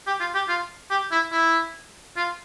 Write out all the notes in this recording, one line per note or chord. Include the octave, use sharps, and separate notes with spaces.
G4
F4
G4
F4
G4
E4
E4
F4